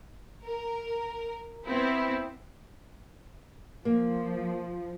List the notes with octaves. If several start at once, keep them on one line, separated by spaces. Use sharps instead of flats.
A#4
B3 C4 E4
F3 A#3